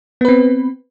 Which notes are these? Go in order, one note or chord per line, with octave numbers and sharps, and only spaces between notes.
B3 C4 B4